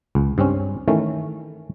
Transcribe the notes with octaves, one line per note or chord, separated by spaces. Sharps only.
C#2
G2 C4 C#4
D#3 E3 A3 C#4